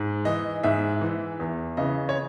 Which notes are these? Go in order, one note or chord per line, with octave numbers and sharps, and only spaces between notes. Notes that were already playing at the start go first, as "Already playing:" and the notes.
Already playing: G#2
E3 D#5
G#2 E5
E3
E2
C#3 E3 D#5
C#5